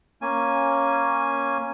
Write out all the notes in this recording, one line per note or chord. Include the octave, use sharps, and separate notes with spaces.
A#3 C#4 G#5